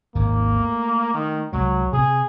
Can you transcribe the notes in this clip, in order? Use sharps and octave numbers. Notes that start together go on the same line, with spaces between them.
G#1 D#2 G#2 A#3
A3
D#3
C2 F#3 G#3
C3 C4 G#4